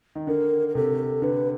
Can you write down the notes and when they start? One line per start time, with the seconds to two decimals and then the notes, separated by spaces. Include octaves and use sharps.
0.15 D#3
0.27 D3 A#4
0.68 A#4
0.75 C3 A4
1.22 D3 B4